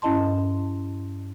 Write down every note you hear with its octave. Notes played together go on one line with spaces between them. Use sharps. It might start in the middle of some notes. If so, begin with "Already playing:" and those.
G2 C#4 E4 D#5 A5 C6